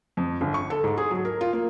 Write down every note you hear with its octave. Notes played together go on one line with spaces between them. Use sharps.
F2
G1
C#6
A4
G#2
G#4
F#3
A#4
F4
A#3